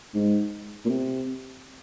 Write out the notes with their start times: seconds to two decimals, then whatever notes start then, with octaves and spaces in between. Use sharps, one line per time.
0.15 G#2
0.85 A#2
0.89 C3